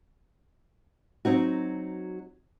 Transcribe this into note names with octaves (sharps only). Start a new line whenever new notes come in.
F#3 C4 D#4 F#4